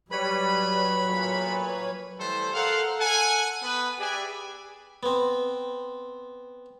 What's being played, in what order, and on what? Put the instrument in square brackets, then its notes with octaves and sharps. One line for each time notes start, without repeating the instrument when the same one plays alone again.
[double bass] F#3 [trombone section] G3 [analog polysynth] B4 C#5 [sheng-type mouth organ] B5
[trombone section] B1 A#2
[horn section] E3 G3 A3 A4 C5
A4 A#4 C5 F5 F#5
A4 F#5 G#5
B3 B4
G4 G#4 B4 D5 E5 G#5
[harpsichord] B3 C4